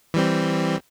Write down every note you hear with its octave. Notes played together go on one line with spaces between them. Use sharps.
E3 G3 C4